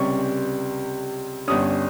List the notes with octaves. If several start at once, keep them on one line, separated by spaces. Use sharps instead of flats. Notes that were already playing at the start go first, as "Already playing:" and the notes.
Already playing: C#2 C3 G3 C#4 C#6
G1 G2 G3 C#4 D#6